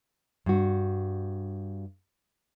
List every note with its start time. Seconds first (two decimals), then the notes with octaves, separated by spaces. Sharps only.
0.46 G2 F#4